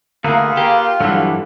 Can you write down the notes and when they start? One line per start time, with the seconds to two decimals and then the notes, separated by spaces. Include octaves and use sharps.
0.24 D2 A#3 F4 G#4 A4 B4
0.57 A#3 G4
1.00 G2 D3 E3 F#3 G3